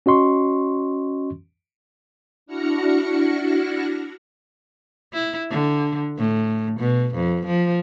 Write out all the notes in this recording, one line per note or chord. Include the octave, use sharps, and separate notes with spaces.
C#4 F#4 D#5 C6 C#6
D4 E4 F#4 F6 A#6 C#7
E4
D3
A2
B2
F2
F3